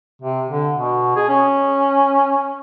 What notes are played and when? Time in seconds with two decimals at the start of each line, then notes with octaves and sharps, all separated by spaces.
0.22 C3
0.50 D3
0.76 B2
1.16 G#4
1.29 C#4